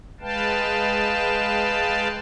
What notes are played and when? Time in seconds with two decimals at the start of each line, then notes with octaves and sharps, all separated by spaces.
0.21 G#3 B4 F5 G5 A5